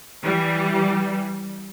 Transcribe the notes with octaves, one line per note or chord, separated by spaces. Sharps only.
E3 G3